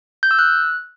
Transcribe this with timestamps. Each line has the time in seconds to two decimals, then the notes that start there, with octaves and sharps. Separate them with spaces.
0.23 G6
0.31 E6
0.39 F#6